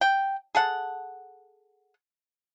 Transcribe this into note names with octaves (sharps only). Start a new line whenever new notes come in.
G5
G#4 A4 F#5